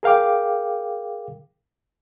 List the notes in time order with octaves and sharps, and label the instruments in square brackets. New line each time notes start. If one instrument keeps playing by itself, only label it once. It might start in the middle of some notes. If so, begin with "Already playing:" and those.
[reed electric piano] G#4 A#4 F5 G5 D6